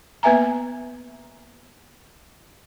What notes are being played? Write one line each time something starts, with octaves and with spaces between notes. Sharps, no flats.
A#3 B3 B4 E5 G#5 A#5